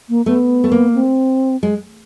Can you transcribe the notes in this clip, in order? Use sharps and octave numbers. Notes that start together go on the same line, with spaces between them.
A#3
A3 B3
A3
A#3
C4
G#3